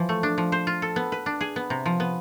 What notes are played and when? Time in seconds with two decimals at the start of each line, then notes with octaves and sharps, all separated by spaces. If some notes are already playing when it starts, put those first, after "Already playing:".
Already playing: E3 F3
0.09 A3
0.23 D4
0.38 F3
0.52 C5
0.67 F4
0.82 A4
0.96 B3
1.12 B4
1.26 D4
1.41 G#4
1.56 B3
1.70 C3
1.86 F3
2.00 B3